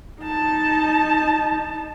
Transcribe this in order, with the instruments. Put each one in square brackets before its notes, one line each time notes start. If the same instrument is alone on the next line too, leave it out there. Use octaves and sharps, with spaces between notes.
[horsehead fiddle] D#4 A5